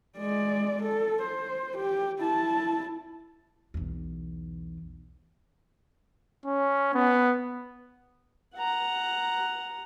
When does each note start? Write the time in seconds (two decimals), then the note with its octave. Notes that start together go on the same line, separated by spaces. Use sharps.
0.18 G#3 D5
0.82 A4
1.22 C5
1.77 G4
2.21 E4 A5
3.74 B1 E2
6.46 C#4
6.94 B3
8.55 F#5 A#5